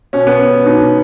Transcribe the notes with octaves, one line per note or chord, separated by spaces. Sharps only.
B2 C#4
B3
C#4
B2 D#4